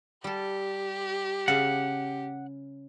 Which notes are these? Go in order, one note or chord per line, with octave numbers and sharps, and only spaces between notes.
G3 G4 A4
C#3 F5 F#5